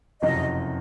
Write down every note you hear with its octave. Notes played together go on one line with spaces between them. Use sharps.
F#1 F2 C3 F#3 C#4 D#5